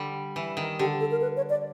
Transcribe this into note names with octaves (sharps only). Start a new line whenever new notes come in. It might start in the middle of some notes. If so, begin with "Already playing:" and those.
Already playing: D3 G3
E3
D#3
D3 G4
A4
A#4
B4
C#5
D5